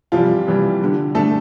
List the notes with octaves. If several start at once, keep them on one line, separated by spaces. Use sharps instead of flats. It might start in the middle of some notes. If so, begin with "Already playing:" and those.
C3 E3 F3 G3 F4
C3 E3 G3
D3 G3
D3 G3 A3 A4